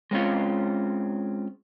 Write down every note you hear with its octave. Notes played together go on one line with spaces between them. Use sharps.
G#3 C4 C#4 F4